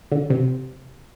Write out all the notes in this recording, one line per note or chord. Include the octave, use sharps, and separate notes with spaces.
D3
C3